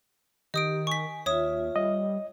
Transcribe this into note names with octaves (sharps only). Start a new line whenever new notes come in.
D#3 G4 D#5 D#6 D7
G#5 C#6 B6
D#2 F4 C#5 E5 D#6
G3 D#5